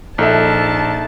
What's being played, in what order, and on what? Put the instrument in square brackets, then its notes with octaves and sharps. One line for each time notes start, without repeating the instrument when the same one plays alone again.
[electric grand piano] A#1 [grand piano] D#4 A4 E5 [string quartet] A5